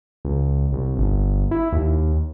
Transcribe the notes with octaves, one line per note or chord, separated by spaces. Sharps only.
C#2
C2
G1
E4
D#2